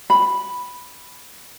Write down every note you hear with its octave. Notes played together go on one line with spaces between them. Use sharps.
B5